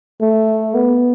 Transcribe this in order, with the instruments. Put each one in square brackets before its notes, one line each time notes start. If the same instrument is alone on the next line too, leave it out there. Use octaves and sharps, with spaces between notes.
[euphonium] A3
B3